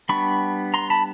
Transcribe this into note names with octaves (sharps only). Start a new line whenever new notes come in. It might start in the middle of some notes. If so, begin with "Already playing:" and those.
G3 B3 D4 B5 C#6
A#5 C6
A5 B5